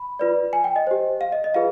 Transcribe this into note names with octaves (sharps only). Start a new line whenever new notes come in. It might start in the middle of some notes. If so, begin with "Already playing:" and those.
Already playing: B5
F4 B4 D5
G#5
G5
D#5
G4 C5
F5
D#5
D#5
F4 G#4 B4 F5